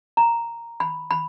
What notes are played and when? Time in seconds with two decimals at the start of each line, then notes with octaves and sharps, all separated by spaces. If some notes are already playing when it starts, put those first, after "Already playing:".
0.17 A#5
0.80 B5
1.11 B5